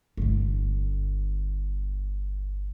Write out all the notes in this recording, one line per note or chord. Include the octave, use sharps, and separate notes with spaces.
G1 D3